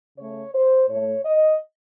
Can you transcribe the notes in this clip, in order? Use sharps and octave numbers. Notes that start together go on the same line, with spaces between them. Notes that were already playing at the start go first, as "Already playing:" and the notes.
C#3 A3 C#5
C5
A2 A3 C#5
D#5